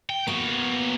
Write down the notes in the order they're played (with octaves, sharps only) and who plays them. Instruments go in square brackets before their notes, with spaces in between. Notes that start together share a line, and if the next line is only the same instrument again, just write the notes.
[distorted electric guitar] G5
[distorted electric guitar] A#3 F#4 [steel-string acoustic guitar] B3